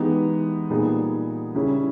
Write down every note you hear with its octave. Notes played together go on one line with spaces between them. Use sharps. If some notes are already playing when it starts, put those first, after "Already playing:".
Already playing: E3 G#3 B3 D#4 G4
A#2 G3 B3 D#4 G#4
C#3 G3 C#4 E4 G#4